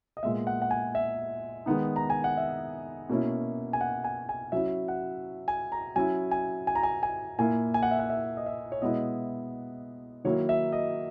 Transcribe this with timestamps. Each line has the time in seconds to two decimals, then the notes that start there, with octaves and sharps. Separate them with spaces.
0.17 D#5
0.23 A#2 G#3 B3 E5
0.47 F#5
0.62 F#5
0.71 G#5
0.95 E5
1.66 D#3 G#3 B3 D#4
1.96 A#5
2.10 G#5
2.24 F#5
2.37 E5
3.10 B2 A#3 C#4 E4
3.73 G#5
3.81 F#5
4.04 G#5
4.29 G#5
4.52 F#3 C#4 E4 E5
4.88 F#5
5.48 G#5
5.72 A#5
5.96 F#3 C#4 E4 G#5
6.31 G#5
6.67 G#5
6.75 A#5
6.83 G#5
7.03 G#5
7.39 A#2 A#3 E4 G#5
7.74 G#5
7.83 F#5
7.91 E5
7.99 F#5
8.10 E5
8.37 D#5
8.46 E5
8.72 C#5
8.82 B2 G#3 B3 E4 D#5
10.24 D#3 F#3 A#3 E4 C#5
10.49 E5
10.72 D#5